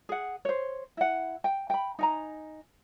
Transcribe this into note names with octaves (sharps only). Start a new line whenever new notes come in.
G#4 F#5
C5 C#5
E4 F#5
G5
G5 B5
D#4 G#5 A#5